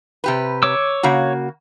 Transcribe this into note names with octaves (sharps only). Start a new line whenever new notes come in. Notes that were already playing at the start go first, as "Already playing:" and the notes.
C3 G4 B4
C#5 D6 E6
C#3 A#3 F#4